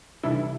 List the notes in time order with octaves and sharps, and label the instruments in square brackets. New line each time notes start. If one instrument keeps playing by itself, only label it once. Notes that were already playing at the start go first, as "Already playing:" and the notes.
[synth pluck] C3 E3 G3 D4 A4 [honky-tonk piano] E4